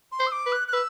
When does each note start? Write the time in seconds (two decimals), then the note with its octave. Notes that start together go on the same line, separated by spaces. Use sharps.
0.12 C6
0.20 C5
0.27 E6
0.32 D6
0.46 B4
0.52 F#6
0.68 F#6
0.73 B4 E6